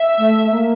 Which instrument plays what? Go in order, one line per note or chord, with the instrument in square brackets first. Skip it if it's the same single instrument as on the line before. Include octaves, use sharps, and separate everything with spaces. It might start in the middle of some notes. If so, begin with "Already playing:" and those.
Already playing: [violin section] E5
[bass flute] A3
A#3